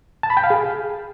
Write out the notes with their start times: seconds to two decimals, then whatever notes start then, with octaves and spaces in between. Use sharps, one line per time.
0.23 A5
0.30 B5
0.37 G5
0.44 F5
0.50 G#4